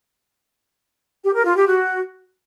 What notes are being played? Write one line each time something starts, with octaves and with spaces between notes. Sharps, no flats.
G4
A#4
F4
G4
F#4